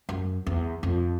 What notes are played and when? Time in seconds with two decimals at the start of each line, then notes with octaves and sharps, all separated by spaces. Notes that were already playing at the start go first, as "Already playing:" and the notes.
0.09 F#2
0.47 E2
0.83 F2